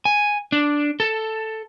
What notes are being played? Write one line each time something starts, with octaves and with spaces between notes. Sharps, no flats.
G#5
D4
A4